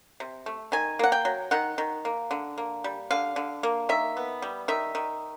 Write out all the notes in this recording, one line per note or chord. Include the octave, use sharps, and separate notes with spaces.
C3
A3
D#3 G#5
A#3 F#5
G5
F#3
D#3 F#5
D#3
A#3
D3
A#3
G3
D3 F5
D3
A#3
D#3 E5
B3
G3
D#3 E5
D#3